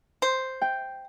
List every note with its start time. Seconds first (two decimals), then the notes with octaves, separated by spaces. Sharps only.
0.22 C5
0.62 G5